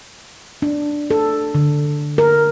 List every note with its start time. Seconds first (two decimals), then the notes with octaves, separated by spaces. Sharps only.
0.62 D4
1.11 A4
1.55 D3
2.18 A#4